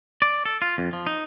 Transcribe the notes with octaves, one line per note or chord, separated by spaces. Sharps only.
D5
A4
F4
F2
F3
D#4